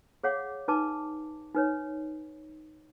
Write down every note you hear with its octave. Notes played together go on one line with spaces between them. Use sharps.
G#4 C#5 F5 F#5 D6
D#4 B4 A5 D6
D#4 B4 C#5